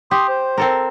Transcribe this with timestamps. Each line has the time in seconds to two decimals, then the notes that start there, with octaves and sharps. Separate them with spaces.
0.11 G4 C6 D#6
0.29 C5
0.58 C4 A4 A#4